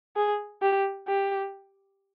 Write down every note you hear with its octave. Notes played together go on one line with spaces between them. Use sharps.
G#4
G4
G4